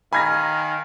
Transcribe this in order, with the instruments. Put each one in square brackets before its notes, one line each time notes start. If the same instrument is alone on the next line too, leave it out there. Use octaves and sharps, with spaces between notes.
[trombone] D#3 [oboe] F5 [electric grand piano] G#5 A#5 [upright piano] B5 G#6 A#6